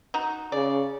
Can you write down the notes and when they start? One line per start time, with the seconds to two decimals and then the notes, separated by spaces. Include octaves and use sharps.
0.14 D#4 F#4
0.52 C#3 D5